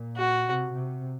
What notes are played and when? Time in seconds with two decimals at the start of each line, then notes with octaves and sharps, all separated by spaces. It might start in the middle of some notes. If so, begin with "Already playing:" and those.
Already playing: A#2
0.16 F#4
0.46 C3
0.74 C3